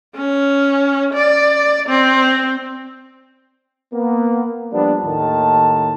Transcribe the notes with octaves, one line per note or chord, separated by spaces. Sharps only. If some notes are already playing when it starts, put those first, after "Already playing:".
C#4
D5
C4
A#3 B3
F3 G3 A#3 B3 D4
D#2 A2 D#3 A5